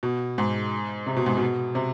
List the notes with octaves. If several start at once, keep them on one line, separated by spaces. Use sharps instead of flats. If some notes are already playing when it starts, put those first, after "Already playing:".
B2
G#2
C3
B2
G#2
B2
C3